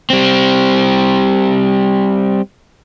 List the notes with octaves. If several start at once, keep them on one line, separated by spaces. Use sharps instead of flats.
G3 C4